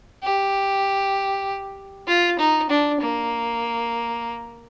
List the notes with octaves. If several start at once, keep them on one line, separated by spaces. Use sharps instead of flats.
G4
F4
D#4
D4
A#3